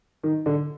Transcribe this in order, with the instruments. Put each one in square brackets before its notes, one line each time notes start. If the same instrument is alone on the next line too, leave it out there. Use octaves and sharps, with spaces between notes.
[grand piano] D#3
D3